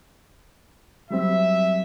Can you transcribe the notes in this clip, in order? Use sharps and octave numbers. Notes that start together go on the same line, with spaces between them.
F#3 G3 C4 E5